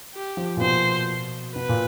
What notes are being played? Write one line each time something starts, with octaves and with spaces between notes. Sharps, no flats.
G4
F3
A#2
B2 C5
B2 B4
A#2